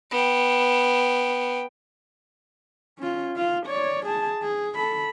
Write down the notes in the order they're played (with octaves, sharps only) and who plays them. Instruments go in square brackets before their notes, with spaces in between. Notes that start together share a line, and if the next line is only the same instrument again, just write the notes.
[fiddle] B3 G5
[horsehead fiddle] C#4 F4
F4 F5
C#5 D5
G#4 A5
G#4
A4 B5